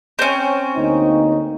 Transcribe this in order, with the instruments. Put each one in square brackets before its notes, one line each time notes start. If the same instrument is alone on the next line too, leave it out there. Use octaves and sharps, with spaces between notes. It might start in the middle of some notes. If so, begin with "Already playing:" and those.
[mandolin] C4 C#4
[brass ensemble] D2 A#3 D#4